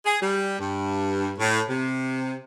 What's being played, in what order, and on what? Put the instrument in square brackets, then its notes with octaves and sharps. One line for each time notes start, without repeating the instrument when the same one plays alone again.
[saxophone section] G#4
G3
G2
A2
C3